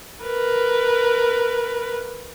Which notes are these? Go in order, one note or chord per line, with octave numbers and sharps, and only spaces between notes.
A#4 B4